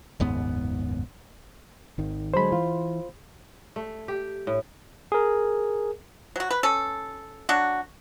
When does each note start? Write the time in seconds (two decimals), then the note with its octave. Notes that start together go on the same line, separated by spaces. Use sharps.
0.20 F#1 D#2 G#2 B3
1.98 G#1 D#3
2.34 D3 F#3 G#3 C5 B5
2.52 E3 F4
3.76 A3
4.08 G4
4.47 A2
5.12 G#4 A#4
6.36 F#3 F#4
6.51 B4
6.63 C#4 A4
7.49 F#3 D4 F#4